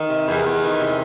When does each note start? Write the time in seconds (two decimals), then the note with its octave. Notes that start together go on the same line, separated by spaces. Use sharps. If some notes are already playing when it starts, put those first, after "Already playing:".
Already playing: D#3
0.09 C3
0.27 E2
0.45 E2
0.63 D#3
0.79 C3